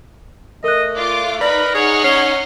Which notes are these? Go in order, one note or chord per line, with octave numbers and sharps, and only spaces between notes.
A3 A#4 D#5 F#6
F4 D5 D6
D#4 A#4 B4 D5 B5
D#4 G#4 C#5 F#5 F6
C#4 C7 G7